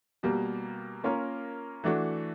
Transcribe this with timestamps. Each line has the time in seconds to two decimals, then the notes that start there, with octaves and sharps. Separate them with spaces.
0.23 B2 G3 A#3
1.04 A#3 C#4 F4 A#4
1.84 E3 A3 D4 F#4